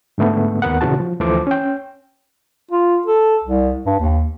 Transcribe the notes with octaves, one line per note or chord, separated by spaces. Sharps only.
G#2 D3 A3 B3
D#2 B3 A#4 F#5
A#2 C#3 E3 F#4 A5
F3
D2 E3 F3 A4 C5 D6
C#4 G5
F4
A4
C2
G2
D#2